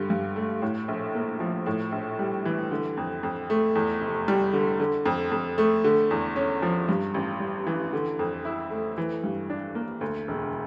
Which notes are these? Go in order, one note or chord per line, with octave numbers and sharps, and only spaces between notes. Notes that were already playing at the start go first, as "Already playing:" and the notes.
Already playing: G2 D3
G2
A3
A2
A#1
A#3
F3
A2
A#1
G3
E3
D3
F2
F2
A3
E2
F1
G3
D3
D3
F2
F2
A3
D3
E2
C#4
F3
G2
A1
G3
E3
D3
F2
E4
A3
E3
G2
D4
A#3
D2
E1